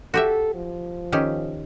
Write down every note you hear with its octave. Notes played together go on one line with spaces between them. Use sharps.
F#4 G4 A4 E5
F3
D#3 C#4 G4